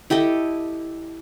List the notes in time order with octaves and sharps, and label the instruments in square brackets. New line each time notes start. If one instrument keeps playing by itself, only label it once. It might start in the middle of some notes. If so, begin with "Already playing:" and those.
[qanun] E4 G4 A4 D#5